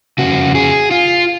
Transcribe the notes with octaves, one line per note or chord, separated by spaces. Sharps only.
F2 C#3 F#4
G#4
F4